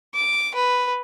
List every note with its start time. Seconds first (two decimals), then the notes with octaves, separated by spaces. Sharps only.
0.15 D6
0.55 B4